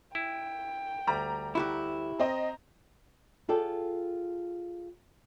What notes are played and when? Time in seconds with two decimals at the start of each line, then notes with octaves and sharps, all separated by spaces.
0.15 E4 G5
1.07 D2 G3 A#5
1.55 E4 F#4 G4
2.19 C4 D#5 A#5
3.49 F4 G#4 A4 D5 G5